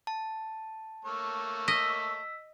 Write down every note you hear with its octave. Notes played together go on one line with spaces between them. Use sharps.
A5
A3 A#3 C#5
D#5 E6 B6